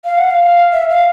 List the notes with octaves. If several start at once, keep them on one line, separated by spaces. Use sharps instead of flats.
F5
F#5
F5
E5
F5